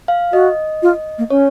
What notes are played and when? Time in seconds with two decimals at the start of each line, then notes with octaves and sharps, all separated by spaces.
0.08 F5
0.32 F#4 D#5
0.82 F4
1.18 A#3
1.30 C#4 C#5